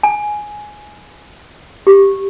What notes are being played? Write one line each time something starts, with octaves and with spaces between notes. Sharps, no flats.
G#5
G4